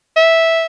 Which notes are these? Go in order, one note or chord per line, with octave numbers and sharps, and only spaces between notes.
E5